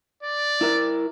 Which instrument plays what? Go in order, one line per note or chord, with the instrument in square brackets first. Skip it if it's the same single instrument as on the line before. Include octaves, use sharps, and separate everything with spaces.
[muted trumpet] D5
[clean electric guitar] E4 A#4 E5